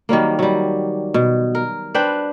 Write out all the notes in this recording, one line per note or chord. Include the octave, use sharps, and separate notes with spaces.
D#3 F#3 G3 A#3
F#3 G3
B2
A#4
D4 B4 C5 G5